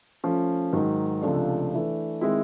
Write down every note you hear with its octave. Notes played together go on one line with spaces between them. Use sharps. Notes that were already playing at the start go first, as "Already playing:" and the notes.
F3 A3 C#4
G#2 D#3 F#3
C#2 C3 F3 A3 D4
E3 A3 D4
D#3 G#3 C4 E4